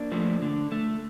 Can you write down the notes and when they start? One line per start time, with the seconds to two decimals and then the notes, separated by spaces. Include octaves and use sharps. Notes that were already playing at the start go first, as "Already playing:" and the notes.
Already playing: A#3 D4
0.12 F3 A3
0.42 D3
0.72 A3